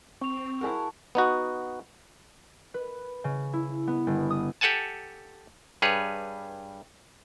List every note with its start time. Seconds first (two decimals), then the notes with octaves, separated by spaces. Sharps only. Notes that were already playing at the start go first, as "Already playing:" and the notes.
0.21 C4 C#6 F7
0.61 E4 F#4 G#4 A#4 A5
1.15 B3 D#4 F#4
2.74 B4
3.24 C#3
3.53 E4
3.87 B3
4.07 G1
4.30 D#6
4.61 G4 A4 F#5 G#5 A5
5.82 G2 G3 G#4 B4 C#5